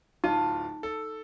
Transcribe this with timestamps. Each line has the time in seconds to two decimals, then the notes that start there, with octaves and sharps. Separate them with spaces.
0.24 D1 D#4 F4 A5
0.83 A4